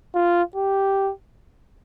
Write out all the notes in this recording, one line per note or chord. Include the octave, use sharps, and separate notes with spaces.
F4
G4